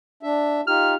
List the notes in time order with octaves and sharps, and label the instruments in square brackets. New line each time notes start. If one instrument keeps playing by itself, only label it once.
[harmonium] D4 E5
[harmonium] D#4 F4 G4 [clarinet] F6